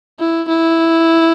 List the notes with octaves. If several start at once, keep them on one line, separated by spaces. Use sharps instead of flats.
E4
E4